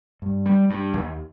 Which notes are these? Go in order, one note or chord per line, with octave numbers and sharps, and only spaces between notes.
G2
G3
G2
D#2